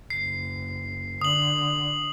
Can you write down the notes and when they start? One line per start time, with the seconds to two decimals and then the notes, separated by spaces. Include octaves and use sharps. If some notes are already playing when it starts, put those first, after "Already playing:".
0.10 F#1 C7
1.21 D3 D#6 F#7